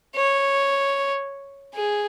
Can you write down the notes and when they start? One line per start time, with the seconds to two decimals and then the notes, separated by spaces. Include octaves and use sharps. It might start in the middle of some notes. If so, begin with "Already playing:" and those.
0.16 C#5
1.74 G#4